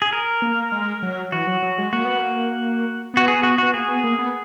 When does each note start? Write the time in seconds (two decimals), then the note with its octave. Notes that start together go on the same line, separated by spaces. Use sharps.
0.02 G#4
0.13 A#4
0.42 A#3
0.72 G#3
1.03 F#3
1.32 E3 F#4
1.47 F#3
1.62 F#3
1.78 G#3
1.93 A#3 F#4
2.05 B3
2.18 A#3
3.14 B3 F#4
3.28 G#4
3.43 F#4
3.58 B3 F#4
3.73 A#3 G#4
3.88 B3
4.04 A#3
4.19 B3